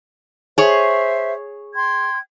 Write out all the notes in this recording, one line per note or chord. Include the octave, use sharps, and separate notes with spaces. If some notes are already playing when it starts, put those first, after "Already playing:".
G#4 C5 C#5 E5
G5 C6 G#6